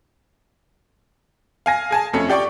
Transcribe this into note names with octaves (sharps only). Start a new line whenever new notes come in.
F5 G#5 A#6
G#4 G#5 A5
F2 A3 C#4
G4 D5 G5 C#6